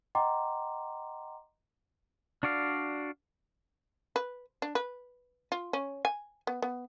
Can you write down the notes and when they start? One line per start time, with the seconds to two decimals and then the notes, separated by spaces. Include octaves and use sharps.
0.15 D#5 F#5 G5 A#5 C6 D6
2.43 D4 F#4 D5 F5
4.16 B4
4.62 D4
4.75 B4
5.52 F4
5.73 C#4
6.05 G#5
6.47 B3
6.62 B3